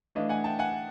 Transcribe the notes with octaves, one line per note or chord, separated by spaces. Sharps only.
E3 A3 D4 D#5 F5
F#5 G#5
G5 A5
F#5 G#5